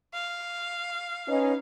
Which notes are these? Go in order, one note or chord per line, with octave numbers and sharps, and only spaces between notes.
F5
C#4 D#4 B4